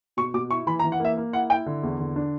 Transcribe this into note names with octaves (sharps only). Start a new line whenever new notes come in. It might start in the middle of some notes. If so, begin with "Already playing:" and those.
B2 C#6
B2 D6
E4 C#6
E3 B5
A#5
E3
F#5
A#3 E5
A#3
E4 F#5
E4 G5
D3
E2
D3
D4